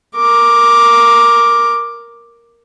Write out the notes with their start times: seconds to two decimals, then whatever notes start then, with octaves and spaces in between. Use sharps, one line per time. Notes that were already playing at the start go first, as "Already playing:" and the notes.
0.16 A#4 D6